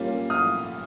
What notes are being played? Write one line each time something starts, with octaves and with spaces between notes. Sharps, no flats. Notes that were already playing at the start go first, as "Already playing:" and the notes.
Already playing: A#2 G3 A#3 C#4
D#6 F6